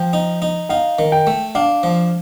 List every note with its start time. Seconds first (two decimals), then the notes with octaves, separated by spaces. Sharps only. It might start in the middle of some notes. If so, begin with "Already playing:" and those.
Already playing: F3 G5
0.13 D#4
0.42 D#4
0.69 D#4 F5
0.99 D#3
1.12 G5
1.27 A3
1.55 D4 F5
1.83 F3